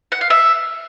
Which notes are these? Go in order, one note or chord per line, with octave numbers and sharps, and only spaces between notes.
F#5
F5
E5